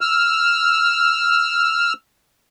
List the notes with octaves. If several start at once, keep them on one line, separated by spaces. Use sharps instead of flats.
E6 F6